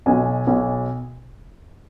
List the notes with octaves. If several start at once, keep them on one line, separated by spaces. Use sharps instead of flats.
B1 B2 G#5
B1 B2